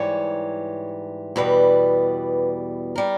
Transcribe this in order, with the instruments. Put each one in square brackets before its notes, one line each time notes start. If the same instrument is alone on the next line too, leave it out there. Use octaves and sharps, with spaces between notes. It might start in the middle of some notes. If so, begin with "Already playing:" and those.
Already playing: [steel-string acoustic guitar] G#2 E3 G3 C#5
E2 B2 G3 B4
G3 A#4